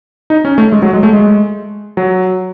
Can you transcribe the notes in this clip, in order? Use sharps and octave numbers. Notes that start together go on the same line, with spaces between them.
D#4
C#4
A3
G#3
F#3
G#3
A3
G#3
F#3